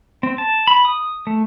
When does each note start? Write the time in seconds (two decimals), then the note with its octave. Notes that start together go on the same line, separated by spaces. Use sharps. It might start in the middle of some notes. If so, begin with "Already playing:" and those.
0.23 C4
0.38 A5
0.67 B5
0.85 D#6
1.27 A3